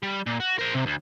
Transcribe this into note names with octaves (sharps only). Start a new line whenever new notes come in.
G3
A#2
F#4
A#4 C5
C3
D2